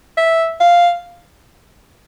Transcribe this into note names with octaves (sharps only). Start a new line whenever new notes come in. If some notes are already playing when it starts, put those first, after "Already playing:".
E5
F5